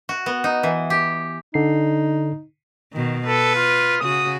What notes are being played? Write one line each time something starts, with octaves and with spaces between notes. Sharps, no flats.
F#4
B3
D#4
E3
G4
D3 D#4 C7
B2 D#3
A4 B4
F4
C#3 F#4 D#6